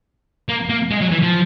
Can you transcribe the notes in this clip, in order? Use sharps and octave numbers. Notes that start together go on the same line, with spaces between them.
A#3
A#3
G#3
F#3
E3
F3